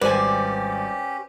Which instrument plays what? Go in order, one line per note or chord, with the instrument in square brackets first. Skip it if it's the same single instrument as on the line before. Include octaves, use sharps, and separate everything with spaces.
[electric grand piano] G#1 G3 [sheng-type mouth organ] C#4 G4 [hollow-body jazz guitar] B4 C5 G#5 [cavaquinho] D5